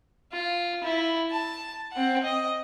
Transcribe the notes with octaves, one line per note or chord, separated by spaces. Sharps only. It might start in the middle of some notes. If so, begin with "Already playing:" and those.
F4
E4
A5
C4 F#5
D#5